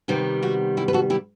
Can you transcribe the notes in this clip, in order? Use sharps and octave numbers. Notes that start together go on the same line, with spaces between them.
C3 D#3 G3 B3 D#4
D#4 F#4
E4 G4
B4
F#4 A4
E4 G4